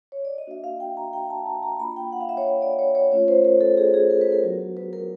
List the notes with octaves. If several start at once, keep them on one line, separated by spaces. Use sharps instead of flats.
C#5
D5
D#5
A#3 D4 F#4 E5
F5
G5
A#5
G5
A5
A#5
A#5
A#3 D4 F4 B5
G5
F#5
F5
E5
C#5
D5
C#5
C#5
A3 C#4 F4 C#5
C5
A#4
A4
G#4
G#4
A#4
B4
A#4
F#3 B3 D4 F#4
B4
A#4